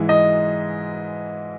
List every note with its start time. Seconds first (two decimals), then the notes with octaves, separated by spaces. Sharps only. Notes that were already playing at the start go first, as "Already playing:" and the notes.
Already playing: G#2 E3 G#3
0.09 D#5